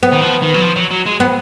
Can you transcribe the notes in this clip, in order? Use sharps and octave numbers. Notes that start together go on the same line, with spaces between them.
B3
D#3
F3
D#3
F#3
F3
F#3
F#3
G#3
B3